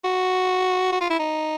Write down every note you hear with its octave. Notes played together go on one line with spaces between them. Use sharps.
F#4
F#4
F4
E4
D#4